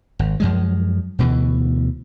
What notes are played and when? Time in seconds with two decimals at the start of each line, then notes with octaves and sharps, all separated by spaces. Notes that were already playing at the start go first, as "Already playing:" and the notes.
0.19 G#1
0.40 F#2 F3 G#3
1.19 D2 B2 E3